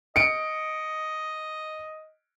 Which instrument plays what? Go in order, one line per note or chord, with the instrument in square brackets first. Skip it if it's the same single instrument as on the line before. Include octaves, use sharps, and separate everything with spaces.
[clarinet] D#5 [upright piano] C#7 D7